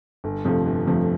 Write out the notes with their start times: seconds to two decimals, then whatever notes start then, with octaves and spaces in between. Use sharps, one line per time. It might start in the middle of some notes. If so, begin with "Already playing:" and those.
0.24 G1
0.45 F2 C3 F3 A3
0.66 G1
0.87 F2 C3 F3 A3